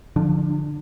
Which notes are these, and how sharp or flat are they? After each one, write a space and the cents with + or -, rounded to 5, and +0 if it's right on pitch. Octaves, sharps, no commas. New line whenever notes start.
D3 +0 F3 +0 D4 +35